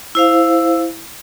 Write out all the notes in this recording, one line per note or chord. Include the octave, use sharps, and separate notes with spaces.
E4 C5 F5